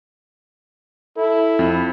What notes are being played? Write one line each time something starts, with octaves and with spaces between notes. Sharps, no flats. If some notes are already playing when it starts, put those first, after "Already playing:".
E4 A4
F2